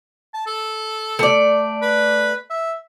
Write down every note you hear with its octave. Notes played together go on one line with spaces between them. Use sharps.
A5
A4
A3 D5
B4
E5